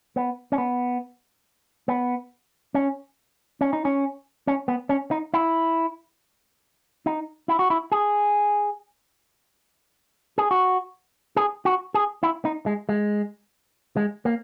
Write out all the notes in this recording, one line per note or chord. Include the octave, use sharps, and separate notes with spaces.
B3
C#4
B3
B3
C#4
C#4
D#4
C#4
C#4
B3
C#4
D#4
E4
D#4
E4
F#4
E4
G#4
G#4
F#4
G#4
F#4
G#4
E4
D#4
G#3
G#3
G#3
A#3